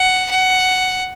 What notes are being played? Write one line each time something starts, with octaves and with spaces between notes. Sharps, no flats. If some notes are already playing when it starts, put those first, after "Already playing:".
Already playing: F#5
F#5